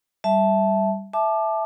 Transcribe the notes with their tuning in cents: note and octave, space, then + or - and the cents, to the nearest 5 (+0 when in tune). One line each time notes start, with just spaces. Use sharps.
G3 +0 E5 +0 A5 -10
E5 +0 A5 -25 D6 +20